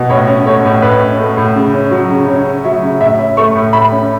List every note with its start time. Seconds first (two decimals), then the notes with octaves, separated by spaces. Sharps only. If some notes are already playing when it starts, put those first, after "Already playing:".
Already playing: B2
0.10 A2 C#5
0.28 C#4
0.46 A3 C#5
0.65 A2
0.82 A2 B4
1.01 C#4
1.20 A3
1.37 A2
1.56 C#3
1.74 C#4
1.91 F#3
2.10 C#3
2.28 C#3 C#5
2.47 C#4
2.64 F#3 E5
2.82 C#3
3.01 A2 E5
3.19 C#4
3.37 A3 C#6
3.55 A2
3.73 A2 B5
3.92 C#4